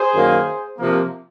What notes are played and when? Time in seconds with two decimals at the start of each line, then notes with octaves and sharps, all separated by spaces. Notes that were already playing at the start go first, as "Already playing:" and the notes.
Already playing: G#4 C5
0.14 F#2 D#3 A#3
0.79 C3 F3 A#3